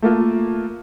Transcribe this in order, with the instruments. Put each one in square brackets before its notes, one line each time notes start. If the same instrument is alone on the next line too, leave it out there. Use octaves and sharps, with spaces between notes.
[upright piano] A3 A#3 F4